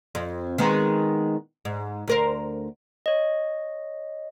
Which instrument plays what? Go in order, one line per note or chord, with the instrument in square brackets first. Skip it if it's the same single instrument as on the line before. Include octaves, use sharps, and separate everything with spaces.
[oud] F2
D#3 G#3 B3
G#2
D2 A#4 C5
[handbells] C#5 D#5